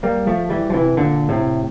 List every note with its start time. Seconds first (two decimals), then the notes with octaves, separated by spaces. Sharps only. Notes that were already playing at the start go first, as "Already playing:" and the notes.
0.03 G3 A#3
0.27 F3 A3
0.50 E3 G3
0.70 F3
0.74 C3 E3
0.97 A#2 D3
1.29 A2 C3